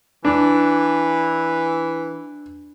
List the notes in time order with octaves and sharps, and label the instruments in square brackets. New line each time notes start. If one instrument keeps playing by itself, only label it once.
[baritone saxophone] E3 [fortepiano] D4